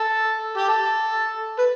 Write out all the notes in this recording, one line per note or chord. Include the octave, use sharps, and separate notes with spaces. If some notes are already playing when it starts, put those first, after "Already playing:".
Already playing: A4
G4
A4
B4